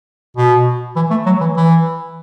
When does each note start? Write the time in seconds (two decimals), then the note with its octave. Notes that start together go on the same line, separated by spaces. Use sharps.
0.36 B2
0.96 E3
1.11 A3
1.26 F#3
1.41 E3
1.57 E3